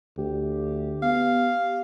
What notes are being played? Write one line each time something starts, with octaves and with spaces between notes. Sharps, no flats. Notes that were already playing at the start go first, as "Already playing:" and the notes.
D2 G4
B3 F5